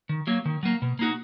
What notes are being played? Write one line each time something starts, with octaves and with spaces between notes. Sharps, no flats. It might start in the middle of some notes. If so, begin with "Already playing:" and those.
D#3
F#3 A#3
D#3
F#3 A#3
B2
A#3 D#4 F#4